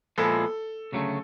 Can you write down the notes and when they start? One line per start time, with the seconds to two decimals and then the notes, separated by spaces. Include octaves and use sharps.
0.18 A#2 F3 G#3 B3 E4 A4
0.92 D2 C#3 F#3 A3